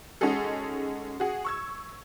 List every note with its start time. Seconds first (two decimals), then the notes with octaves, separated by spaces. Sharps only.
0.21 G#3 C#4 D#4 F#4 G#4 A4
1.20 F#4 G#4
1.45 C#6 E6 G#6